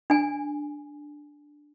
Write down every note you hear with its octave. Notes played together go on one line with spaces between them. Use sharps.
D4 G#5